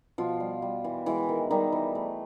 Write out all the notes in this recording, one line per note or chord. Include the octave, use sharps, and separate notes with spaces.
B2 F3 F4
G3
G3
E3
E3 G#3 E4
D#3
D#3 G3 D#4
E3
A3